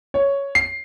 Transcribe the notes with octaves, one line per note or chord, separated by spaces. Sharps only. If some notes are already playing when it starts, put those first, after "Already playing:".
C#5
C7